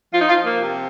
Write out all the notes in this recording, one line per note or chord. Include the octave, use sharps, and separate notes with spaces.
F3 F4
D#4
F4
F3
A#3
C3